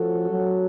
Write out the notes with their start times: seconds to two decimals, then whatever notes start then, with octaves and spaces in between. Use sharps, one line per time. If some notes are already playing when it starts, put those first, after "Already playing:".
Already playing: F3 A3 C#4 F#4 A4
0.30 F#3